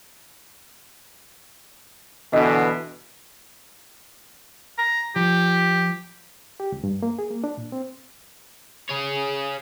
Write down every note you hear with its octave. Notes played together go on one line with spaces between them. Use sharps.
B2 D3 E3 D#5
A#5
F3 G4
G4
C#2
G2
A#3
G#4
A#3
D4
A#2
C4
G#4 C#5